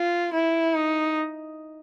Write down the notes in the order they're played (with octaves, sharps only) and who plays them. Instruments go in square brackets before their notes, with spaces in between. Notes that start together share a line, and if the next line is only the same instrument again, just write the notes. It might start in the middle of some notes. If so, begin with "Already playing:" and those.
Already playing: [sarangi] F4
E4
D#4